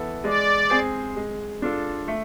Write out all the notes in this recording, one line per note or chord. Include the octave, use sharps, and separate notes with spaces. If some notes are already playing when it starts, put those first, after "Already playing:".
Already playing: E3 B3 E4 A4
G#3 D5
C4 G#4 C5
G#3
D4 F4 A4
A3